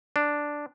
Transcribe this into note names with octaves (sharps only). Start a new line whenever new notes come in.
D4